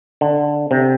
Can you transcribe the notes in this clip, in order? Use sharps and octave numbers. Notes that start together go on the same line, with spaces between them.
D3
C3